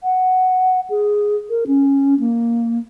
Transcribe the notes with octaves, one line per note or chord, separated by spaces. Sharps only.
F#5
G#4
A#4
C#4
A#3